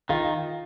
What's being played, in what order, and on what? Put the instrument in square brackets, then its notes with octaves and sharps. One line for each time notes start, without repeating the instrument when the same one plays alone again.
[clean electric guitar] D#3 [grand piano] F4